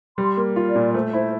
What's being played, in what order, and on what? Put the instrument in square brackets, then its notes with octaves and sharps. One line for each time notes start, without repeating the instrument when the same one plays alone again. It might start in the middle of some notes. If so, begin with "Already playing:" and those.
[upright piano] G3 [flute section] C6
[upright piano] A#3
F4
[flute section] D5
[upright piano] A#2
[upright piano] A3 [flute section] C5
[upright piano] E4 [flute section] C5